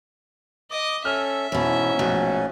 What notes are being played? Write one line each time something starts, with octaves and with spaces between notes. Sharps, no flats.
D#5 D6 D#6
C#4 A4 E5 F6
G#2 B2 E3 C#4
A#1 B2 A3